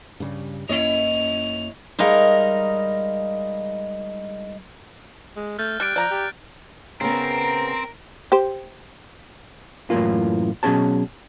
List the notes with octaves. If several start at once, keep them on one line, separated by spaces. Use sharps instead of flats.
G2 C#3 G3
F#2 A#3 C#4 E4 C#5 D#5 F7
G3 G#3 D#4 A#4 D#5 F5
G#3
A3 F6 G6 A6
G3 G4 F#6 A6 D7
F3 D5 A#5
G4
C#3 B3 C4 A#4 A#5
G4 C5
F#2 A2 C#3 E3 A#3 F4
B2 F#3 C#4 G#4 C#5 A5